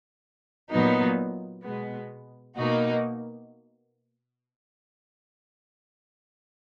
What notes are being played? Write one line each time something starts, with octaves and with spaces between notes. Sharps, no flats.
A#2 F#3 B3 D#4
B2 G#3 B3
B2 A#3 D#4 F#4